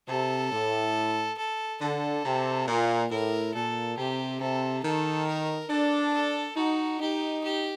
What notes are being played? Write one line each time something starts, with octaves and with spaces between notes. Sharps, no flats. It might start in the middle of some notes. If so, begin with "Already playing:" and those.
C3 A4
A2
A4
D3 A4
C3
A#2 A#4
A2 A#4
A#2 A4
C3 G4
C3 A4
D#3 A4
A#4
D4 A4
A4
D#4 F#4
D#4 G4
G4